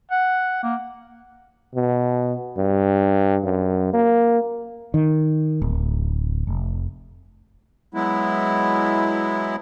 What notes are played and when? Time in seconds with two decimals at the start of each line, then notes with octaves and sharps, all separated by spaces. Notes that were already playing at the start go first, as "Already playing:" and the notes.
0.11 F#5
0.64 A#3
1.75 B2
2.57 G2
3.44 F#2
3.93 A#3
4.94 D#3
5.62 D1
6.47 F1
7.94 F#3 G#3 B3 E4